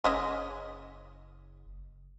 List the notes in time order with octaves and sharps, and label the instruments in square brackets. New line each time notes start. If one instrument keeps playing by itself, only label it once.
[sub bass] F#1 [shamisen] G#3 C#4 D#5